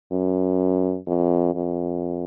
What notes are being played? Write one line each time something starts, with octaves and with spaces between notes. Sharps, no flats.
F#2
F2
F2